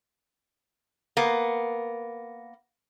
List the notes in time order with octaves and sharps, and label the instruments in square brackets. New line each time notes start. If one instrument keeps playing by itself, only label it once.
[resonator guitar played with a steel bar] A#3 B3